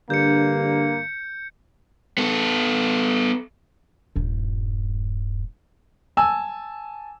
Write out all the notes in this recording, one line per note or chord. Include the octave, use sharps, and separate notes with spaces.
G2 D3 A#3 G6 C#7
B3 A4
D#1 G2
G#5 A5 E6